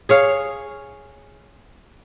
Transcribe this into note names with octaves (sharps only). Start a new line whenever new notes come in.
G#4 C#5 F5